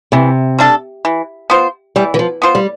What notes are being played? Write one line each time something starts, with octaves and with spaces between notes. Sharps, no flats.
C3 E3
G3 D4 A4
E3
B3 F4 C5
E3 G3
E3
F3
B3 F4 C5
G3